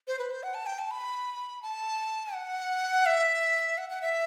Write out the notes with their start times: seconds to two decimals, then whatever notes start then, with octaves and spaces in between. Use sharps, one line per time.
0.08 C5
0.19 B4
0.31 C5
0.43 F#5
0.54 A5
0.66 G5
0.79 A5
0.91 B5
1.62 A5
2.34 F#5
3.06 E5
3.78 F#5
3.90 F#5
4.02 E5